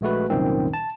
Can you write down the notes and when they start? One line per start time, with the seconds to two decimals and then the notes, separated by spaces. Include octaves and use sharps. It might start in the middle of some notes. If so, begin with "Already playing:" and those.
0.01 A#1 G#3 A3 F#4 B4
0.30 C2 F#2 A#2 D#3 C4
0.73 A5